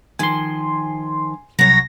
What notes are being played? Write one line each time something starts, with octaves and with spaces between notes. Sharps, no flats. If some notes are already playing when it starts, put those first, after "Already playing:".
D#3 F3 G#5 C6
C2 F#3 C#5 A#6